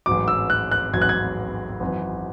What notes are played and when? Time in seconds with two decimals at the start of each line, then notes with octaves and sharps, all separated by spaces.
0.06 A1 G#2 F#3 D6
0.28 E6
0.50 F#6
0.71 F#6
0.93 A1 G#2 F#3 G#6
1.02 F#6
1.09 G#6
1.80 G#1 F#2 E3